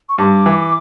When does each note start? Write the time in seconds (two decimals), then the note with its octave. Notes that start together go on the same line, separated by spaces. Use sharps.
0.09 C#6
0.18 G2 D6
0.46 E3